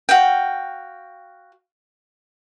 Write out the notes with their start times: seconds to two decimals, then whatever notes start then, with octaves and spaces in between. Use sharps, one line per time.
0.09 F#4 F5 G5